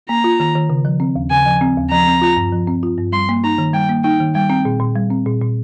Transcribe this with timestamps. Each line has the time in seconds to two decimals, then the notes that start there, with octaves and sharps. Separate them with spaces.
0.09 A#3 A#5
0.24 F4
0.40 D#3
0.55 D#3
0.70 C#3
0.85 F3
1.00 C4
1.16 D#2
1.31 C#3 G#5
1.46 F3
1.61 C4
1.77 D#2
1.91 F3 A#5
2.07 C4
2.22 F4
2.37 G2
2.52 F3
2.68 C4
2.83 F4
2.98 G2
3.12 G3 C6
3.29 A#3
3.44 D#4 A#5
3.58 D#3
3.73 G3 G5
3.89 A#3
4.04 D#4 G5
4.20 D#3
4.35 G3 G5
4.50 C4
4.65 A#2
4.80 A#2
4.96 G3
5.10 C4
5.26 A#2
5.41 A#2